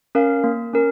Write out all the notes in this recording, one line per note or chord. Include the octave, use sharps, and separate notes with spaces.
C#4 A#4 F5
A#3
C#4 A#4